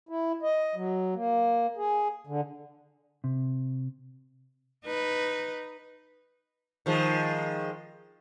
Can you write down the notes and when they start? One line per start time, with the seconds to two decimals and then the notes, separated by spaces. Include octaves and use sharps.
0.09 E4
0.42 D#5
0.75 F#3
1.15 A#3
1.77 G#4
2.27 D3
3.24 C3
4.84 D#4 B4
6.86 D#3 F3 G#3